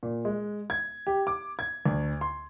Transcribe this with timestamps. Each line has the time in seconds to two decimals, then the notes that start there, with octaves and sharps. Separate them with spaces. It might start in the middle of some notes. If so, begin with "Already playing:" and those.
0.03 A#2
0.25 G#3
0.70 G#6
1.07 G4
1.27 D6
1.59 G#6
1.86 D2
2.21 C6